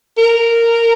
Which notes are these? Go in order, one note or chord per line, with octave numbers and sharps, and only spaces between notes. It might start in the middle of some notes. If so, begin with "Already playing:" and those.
A#4